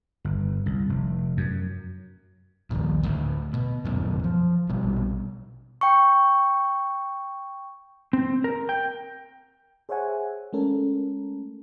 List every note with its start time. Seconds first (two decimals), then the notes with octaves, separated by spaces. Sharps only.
0.25 G1
0.66 C2
0.89 F1
1.37 F#2
2.71 A#1 D#2 A#2
3.03 D2 A2
3.54 B2
3.84 D1 F#2 B2
4.24 F3
4.69 A#1 B2 G3
5.81 G5 C#6
8.13 C4
8.44 A#4
8.69 G5
9.89 G#4 C5 C#5 E5 F#5 G#5
10.53 G#3 A3 C#4 A4 A#4